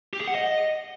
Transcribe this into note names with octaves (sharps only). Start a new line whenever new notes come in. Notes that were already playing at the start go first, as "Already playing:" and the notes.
G4
G#4
F#5
D#5